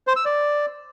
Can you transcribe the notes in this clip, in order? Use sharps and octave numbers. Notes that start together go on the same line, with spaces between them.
C5
E6
D5